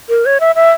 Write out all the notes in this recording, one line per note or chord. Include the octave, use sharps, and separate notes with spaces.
A#4
C#5
E5
E5